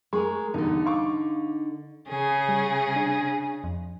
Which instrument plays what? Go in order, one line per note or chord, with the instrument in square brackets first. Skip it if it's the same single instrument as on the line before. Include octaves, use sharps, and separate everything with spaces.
[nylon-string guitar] G#3 G#4 A#4 [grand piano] C#6
[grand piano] E2 G2 B2 [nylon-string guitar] D3 D#4
[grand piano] F5 C#6 D6
[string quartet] C#3 G#4
[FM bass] G3
D4
F2